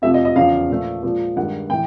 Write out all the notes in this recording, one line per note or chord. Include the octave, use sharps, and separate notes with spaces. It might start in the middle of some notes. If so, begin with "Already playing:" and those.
F2 C3 F3 A3 E5
D#5
D#5
E2 C#3 F3 F5
A#2 F3 A3
A#2 F3 G#3
G2 D#3 G#3 F#5
A2 E3 G5